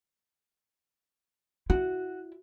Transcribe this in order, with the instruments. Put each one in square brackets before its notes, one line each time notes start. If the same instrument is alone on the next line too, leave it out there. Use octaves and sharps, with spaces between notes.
[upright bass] E4 [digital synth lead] F#4